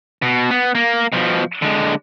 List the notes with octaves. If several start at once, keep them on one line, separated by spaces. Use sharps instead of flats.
B2
B3
A#3
B2 F3
D3 G#3